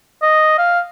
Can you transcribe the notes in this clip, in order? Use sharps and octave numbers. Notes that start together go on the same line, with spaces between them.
D#5
F5